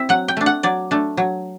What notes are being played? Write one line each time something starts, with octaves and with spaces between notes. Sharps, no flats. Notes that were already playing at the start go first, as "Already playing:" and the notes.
Already playing: C4 E4 E5
F#3 F#5
G5
A3 D4
F#5
F#3 D5
A3 D4
F#3